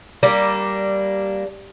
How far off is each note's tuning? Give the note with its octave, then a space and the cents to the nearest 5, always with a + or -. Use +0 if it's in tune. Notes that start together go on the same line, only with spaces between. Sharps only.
G3 -5 A#3 +0 D4 -5